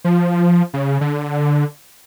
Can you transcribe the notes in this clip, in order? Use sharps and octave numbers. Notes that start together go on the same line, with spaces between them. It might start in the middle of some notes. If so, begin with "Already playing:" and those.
F3
C#3
D3